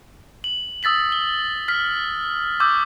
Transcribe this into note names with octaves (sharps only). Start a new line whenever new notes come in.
F#7
D#6 E6 A6 B6 F#7
G7
F6 B6
C#6 D6 E6 G6